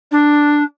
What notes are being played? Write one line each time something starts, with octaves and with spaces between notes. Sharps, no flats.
D4